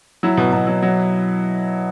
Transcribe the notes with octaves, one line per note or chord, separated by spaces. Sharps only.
F#3 E4
B2
B2
F#3
F#3